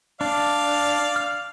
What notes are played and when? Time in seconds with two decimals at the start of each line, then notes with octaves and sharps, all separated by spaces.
0.21 D4 D5 F5
1.16 F6